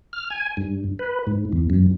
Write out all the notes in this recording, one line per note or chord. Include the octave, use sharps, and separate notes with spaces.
F6
G#5
G2
B4
G#2
E2
F#2